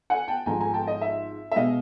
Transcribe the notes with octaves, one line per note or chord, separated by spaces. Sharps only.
F#5 G#5
G5 A5
G#1 G#2 F3 G#5 A#5
G#5 A#5
G5 A5
D#5
E5
E5
B2 G#3 D#5 F5